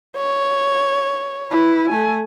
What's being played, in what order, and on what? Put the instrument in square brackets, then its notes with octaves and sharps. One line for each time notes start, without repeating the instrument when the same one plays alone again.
[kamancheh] C#5
[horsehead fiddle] E4 B4
A3 G#5